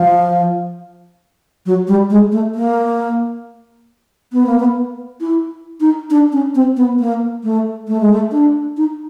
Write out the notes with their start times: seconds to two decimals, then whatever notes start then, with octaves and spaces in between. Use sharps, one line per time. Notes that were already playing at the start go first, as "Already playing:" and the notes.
Already playing: F3
1.66 F#3
1.88 G3
2.10 G#3
2.32 A3
2.55 A#3
4.33 B3
4.46 A#3
4.59 B3
5.21 E4
5.80 D#4
6.10 D4
6.32 C#4
6.55 C4
6.77 B3
6.99 A#3
7.44 A3
7.88 A3
8.00 G#3
8.13 A3
8.32 D4
8.77 D#4